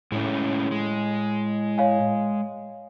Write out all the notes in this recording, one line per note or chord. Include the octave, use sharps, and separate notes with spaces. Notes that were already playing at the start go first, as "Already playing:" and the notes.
A2 G#3 A3 C#4
G#3
C#5 F5 G#5